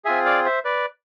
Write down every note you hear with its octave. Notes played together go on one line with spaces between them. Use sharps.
C4 F4 G#4 E5 G#5
D5 F5
C5 E5
B4 D5